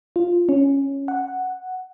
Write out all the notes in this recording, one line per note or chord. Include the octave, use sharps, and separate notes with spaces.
F4
C#4
F#5